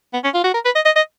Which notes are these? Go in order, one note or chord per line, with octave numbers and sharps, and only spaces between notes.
B3
C#4
F4
F#4
A#4
B4
D#5
D#5
D#5